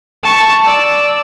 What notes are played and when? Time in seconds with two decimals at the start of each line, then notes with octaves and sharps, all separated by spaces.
0.23 A5 C#6
0.64 D5 E6